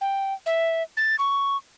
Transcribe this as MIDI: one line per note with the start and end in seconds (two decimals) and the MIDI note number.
0.01 0.34 79
0.46 0.83 76
0.97 1.16 93
1.19 1.57 85